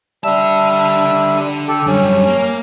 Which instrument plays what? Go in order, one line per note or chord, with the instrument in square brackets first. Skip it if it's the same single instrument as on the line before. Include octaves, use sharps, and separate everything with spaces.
[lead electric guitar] D3 A5 [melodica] G3 E5
[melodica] G4 A4
[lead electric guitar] F#2 G3 [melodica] C#4
[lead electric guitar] A#3